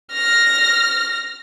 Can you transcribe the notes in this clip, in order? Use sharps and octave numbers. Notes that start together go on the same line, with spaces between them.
F6 A#6